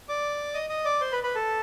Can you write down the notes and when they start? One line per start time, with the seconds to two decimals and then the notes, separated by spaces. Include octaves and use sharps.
0.09 D5 D6
0.54 D#5 D#6
0.69 D#5 D#6
0.85 D5 D6
1.01 C5 C6
1.12 B4 B5
1.23 B4 B5
1.35 A4 A5